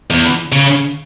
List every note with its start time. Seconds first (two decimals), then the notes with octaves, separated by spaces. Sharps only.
0.10 E2
0.52 C#3